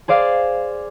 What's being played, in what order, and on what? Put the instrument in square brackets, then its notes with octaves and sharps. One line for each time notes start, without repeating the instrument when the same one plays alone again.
[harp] G#4 C5 D5 F5